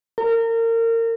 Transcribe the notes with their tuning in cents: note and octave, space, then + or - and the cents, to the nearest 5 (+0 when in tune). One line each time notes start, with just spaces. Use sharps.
A#4 -30